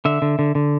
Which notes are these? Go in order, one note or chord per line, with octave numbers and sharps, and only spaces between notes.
D3 E5
D3
D3
D3